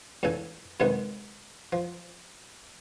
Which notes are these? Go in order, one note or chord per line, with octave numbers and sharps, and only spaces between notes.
E2 A2 C#3 A4 G#5
F#2 C3 D#3 G#3 B3
F3